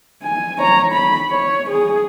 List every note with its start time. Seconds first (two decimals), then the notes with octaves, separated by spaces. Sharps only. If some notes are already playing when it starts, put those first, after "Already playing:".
0.23 G#5
0.58 C#5 A#5
0.92 B5
1.30 C#5
1.69 G#4